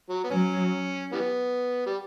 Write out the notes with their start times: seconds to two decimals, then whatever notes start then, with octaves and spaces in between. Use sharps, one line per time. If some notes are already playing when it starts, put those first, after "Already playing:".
0.09 F#3
0.24 B3
0.31 F#3 C#4
1.13 E3 G3 B3
1.86 G3